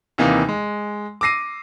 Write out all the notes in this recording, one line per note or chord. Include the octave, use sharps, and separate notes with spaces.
D#2 C3 E3 A#3 D#4
G#3
D6 E6 A#6 C7 D#7